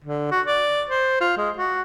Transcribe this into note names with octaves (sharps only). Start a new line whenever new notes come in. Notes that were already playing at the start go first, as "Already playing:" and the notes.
D3
F#4
D5
C5
F4
G#3
F#4